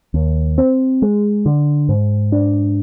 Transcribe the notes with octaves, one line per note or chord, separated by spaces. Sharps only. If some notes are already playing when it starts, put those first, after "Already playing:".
D#2
C4
G#3
D3
G#2
D4